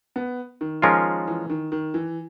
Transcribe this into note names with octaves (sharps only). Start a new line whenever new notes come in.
B3
D#3
F3 G#3 C#4 F4 A#4
E3
D#3
D#3
E3